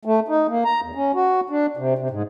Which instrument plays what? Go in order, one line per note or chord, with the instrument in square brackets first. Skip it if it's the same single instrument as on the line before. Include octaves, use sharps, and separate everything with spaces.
[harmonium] A3
D#4
A#3
A#5
E2
C#4
F#4
D4
C3
C3
G#2